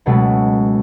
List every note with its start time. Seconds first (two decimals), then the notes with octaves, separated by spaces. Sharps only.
0.06 C#2 B2 F#3 G#3 A3 B3